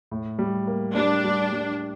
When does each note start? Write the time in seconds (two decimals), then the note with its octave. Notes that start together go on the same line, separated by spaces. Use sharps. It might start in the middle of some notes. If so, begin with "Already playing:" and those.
0.11 A2
0.39 G3
0.67 A#3
0.96 G3 D4
1.24 G3
1.52 G3